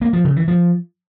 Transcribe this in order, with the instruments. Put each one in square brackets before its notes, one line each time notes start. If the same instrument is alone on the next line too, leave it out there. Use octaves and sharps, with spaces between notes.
[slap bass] A#3
F3
C#3
E3
F3